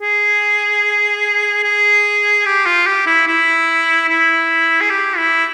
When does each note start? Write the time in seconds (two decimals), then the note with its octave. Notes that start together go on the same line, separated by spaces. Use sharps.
0.01 G#4
1.64 G#4
2.46 G4
2.66 F4
2.86 G4
3.06 E4
3.27 E4
4.09 E4
4.81 G#4
4.90 G4
5.17 E4